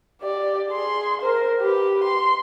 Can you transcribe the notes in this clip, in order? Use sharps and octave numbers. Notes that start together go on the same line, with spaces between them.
G4 D5
G#4 C6
A#4 C5
G4 B4
C6